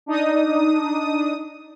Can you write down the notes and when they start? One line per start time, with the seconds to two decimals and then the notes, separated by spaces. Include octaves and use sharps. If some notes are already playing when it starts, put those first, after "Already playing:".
0.06 D4 D#4 D#6